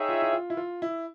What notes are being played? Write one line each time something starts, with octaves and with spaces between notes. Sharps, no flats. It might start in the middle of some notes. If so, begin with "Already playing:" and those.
Already playing: D#4 G#4 C#5 E5 G5
F4
E4
F4
E4
F4
E4